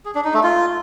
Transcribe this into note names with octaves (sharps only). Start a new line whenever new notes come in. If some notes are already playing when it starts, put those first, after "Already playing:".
G#4
D4
D#4
A3
F4